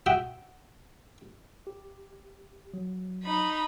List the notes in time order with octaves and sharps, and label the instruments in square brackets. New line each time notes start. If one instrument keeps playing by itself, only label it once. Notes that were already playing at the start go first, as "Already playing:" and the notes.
[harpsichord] F#4 E5 F#5 G5 D#6
[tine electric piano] G4
F#3
[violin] D#4 B5